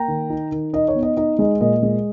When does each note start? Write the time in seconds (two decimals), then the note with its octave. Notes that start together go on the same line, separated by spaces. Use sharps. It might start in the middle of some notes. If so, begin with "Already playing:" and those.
Already playing: A#3 G5 A#5
0.08 D#3
0.30 D#4
0.52 D#3
0.73 D#4 D#5
0.88 C#5
0.95 B3
1.03 D#5
1.17 D#4 D#5
1.39 G#3 D#5
1.61 A#2 D#5
1.83 G#3